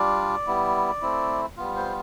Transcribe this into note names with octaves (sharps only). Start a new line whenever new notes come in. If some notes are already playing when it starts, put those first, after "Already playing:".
Already playing: G3 D4 F4 D5
G3 B3 E4
A3 C4 E4
G3 B3 F4
C5